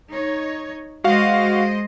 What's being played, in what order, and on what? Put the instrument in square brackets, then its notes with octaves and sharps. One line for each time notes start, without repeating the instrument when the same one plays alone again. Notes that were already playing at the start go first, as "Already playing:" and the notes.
[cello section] D#4 C#5
[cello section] G#3 C5 D#5 [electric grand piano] F#4 F5